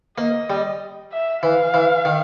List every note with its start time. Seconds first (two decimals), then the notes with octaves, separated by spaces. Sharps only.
0.18 A#3 D#5
0.50 G3
1.12 E5
1.43 E3 F5
1.74 E3
2.05 D#3